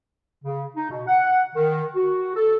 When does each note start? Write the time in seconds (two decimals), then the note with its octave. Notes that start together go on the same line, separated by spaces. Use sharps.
0.44 C#3
0.75 D#4
0.90 B2
1.07 F#5
1.55 D#3
1.95 F#4
2.35 A4